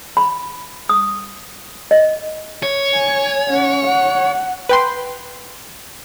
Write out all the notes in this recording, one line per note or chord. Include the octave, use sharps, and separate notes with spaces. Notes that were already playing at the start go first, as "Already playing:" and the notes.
B5
D#6
D#5
C#5
G#5
C#4 F#5
F#5
B4 G5 C6